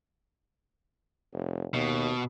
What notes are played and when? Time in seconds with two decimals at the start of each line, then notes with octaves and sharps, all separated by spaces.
1.33 F1
1.74 D#2 B2